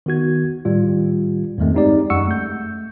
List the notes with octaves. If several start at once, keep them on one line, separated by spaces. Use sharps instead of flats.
D#3 B3 F#4 G#6
A2 D#3 G3 F4
E2 G2 D#3 G#3 A3 C4
G#3 C4 D#4 G4 D5
F#2 G#3 F#5 C#6 E6 C#7
A3 G6